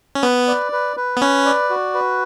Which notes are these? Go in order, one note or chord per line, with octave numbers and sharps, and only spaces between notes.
C#4
B3 B4
D5
B4
B4
B3
C#4 B4
D5
F#4
B4